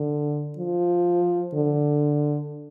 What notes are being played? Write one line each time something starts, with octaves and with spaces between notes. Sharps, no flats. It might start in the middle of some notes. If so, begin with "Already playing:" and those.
Already playing: D3
F3
D3